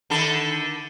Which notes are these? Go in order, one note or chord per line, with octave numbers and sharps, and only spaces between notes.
D3 D#3 A4